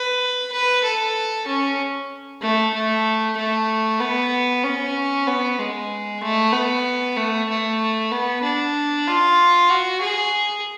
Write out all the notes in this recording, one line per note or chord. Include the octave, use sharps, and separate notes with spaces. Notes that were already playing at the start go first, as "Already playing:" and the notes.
Already playing: B4
B4
A4
C#4
A3
A3
A3
B3
C#4
B3
G#3
A3
B3
A3
A3
B3
D4
F4
F#4
G#4